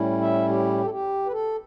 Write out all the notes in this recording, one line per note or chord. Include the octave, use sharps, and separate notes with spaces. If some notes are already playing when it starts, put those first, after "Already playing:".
Already playing: A2 G3 C#4 E4
E5
G4
A4
G4
B4
A4